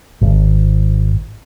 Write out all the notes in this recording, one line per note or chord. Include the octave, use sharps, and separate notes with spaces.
G#1